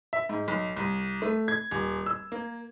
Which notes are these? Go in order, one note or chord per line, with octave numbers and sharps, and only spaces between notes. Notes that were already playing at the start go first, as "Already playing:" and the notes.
E5
G#2
B1
C2
A3
G#6
D#1
E6
A#3